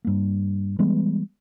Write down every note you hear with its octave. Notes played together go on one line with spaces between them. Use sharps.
G2 A#3
E3 G3 G#3 B3